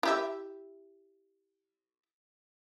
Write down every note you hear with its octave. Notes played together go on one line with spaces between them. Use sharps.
E4 G4 E5